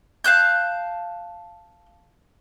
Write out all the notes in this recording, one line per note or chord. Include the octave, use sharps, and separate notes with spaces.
F5 A5 F#6 G6